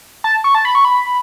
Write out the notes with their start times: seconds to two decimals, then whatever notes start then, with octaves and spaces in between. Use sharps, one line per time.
0.24 A5
0.44 C#6
0.55 A5
0.65 B5
0.75 C#6
0.85 B5